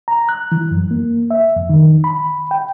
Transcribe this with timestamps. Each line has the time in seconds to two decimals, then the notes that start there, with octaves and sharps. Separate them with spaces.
0.08 A#5
0.29 F#6
0.52 E3
0.71 F#2
0.91 A#3
1.31 E5
1.56 F2
1.69 D#3
2.04 B5
2.51 G5